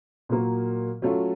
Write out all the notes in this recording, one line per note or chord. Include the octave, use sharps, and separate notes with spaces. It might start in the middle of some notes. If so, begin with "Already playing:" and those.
A#2 F#3 A#3
F#3 A3 C#4 F4